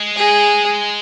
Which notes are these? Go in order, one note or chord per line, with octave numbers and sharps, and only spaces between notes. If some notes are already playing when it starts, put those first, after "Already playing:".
Already playing: G#3
G#4